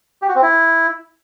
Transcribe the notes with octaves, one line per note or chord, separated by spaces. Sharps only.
G4
F#4
C4
E4